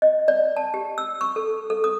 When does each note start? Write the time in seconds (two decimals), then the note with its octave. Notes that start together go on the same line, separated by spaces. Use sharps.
0.02 D#5
0.28 D5
0.56 A5
0.74 G4
0.98 E6
1.21 C#6
1.36 A4
1.70 A4
1.84 D#6